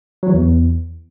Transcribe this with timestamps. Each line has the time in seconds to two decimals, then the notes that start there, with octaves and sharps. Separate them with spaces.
0.23 F#3
0.28 E3
0.34 E2